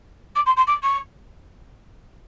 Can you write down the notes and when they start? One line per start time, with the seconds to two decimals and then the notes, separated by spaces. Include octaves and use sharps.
0.35 D6
0.46 C6
0.56 C6
0.67 D6
0.83 C#6